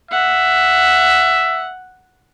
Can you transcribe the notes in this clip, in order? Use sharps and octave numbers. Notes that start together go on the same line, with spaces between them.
E5 F#5